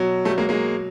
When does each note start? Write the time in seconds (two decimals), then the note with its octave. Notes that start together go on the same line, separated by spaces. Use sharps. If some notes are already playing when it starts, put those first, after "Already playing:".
Already playing: B2 F#3
0.25 G3 A3
0.38 G#3 A#3
0.49 G#3 A#3